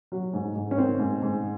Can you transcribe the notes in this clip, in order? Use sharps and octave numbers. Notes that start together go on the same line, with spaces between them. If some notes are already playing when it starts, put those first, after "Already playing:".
F#3
G#2
G#2
C#4
D#3 C4
G#2
G#2